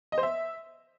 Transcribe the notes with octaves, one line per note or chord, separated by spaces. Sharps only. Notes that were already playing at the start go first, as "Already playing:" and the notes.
D#5
C5
E5